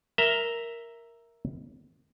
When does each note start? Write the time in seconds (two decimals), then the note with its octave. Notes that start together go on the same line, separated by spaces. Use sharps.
0.18 A#4 E5 A#5 G7